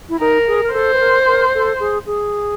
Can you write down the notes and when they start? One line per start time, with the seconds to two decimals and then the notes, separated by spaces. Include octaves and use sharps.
0.09 E4
0.19 D#4 A#4
0.47 G#4
0.63 A#4
0.73 A4 C5
0.94 B4
1.00 A#4
1.26 A#4
1.54 A4
1.80 G#4
2.06 G#4